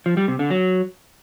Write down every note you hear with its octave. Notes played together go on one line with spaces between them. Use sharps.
F3
G3
C3
D3
F#3